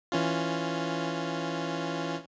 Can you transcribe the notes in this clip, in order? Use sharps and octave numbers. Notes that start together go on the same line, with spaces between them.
E3 C#4 F4